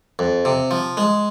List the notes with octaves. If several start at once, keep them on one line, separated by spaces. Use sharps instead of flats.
F2
C3
F3
G#3